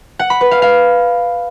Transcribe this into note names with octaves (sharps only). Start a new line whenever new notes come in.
F#5
B5
B4
F5
F5